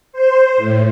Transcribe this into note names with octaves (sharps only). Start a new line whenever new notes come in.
C5
A2